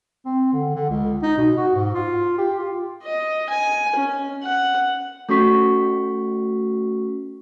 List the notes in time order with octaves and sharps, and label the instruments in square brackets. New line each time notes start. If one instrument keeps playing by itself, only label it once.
[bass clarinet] C4
D3
D3
C#2
D#4
B2
F#4
G#2
F4
G4
F4
[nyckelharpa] D#5
G#5
C#4
F#5
[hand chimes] A3 C#4 F#4 C#6 B6